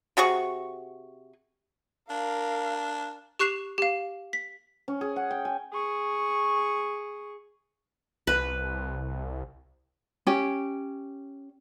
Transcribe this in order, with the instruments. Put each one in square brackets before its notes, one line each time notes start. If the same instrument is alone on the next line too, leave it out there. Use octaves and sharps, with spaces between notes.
[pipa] C3 F#4 G#4 C#6
[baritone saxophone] D4 [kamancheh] A#4 F5
[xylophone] G4 C#6 F#6 C7 E7 F7
G4 F5
B6
[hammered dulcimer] C#4
G#4
F#5
G5
G#5
[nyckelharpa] G#4 C#6
[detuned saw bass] C2 [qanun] B4
[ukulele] C#4 G4